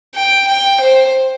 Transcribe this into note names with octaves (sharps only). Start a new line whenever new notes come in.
G5
G5
C5